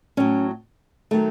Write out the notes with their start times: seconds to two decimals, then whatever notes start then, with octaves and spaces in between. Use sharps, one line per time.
0.17 A2 F#3 C#4
1.11 D#3 F#3 A3